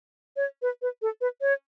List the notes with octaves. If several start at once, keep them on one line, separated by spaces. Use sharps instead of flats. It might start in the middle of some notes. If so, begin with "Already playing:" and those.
C#5
B4
B4
A4
B4
C#5